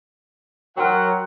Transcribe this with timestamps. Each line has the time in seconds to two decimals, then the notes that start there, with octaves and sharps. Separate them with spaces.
0.77 F#3 A#4 F#5 G5 C6 F6